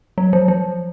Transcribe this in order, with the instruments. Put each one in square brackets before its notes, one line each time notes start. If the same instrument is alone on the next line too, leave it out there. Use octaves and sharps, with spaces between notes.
[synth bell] F#3
F3
F3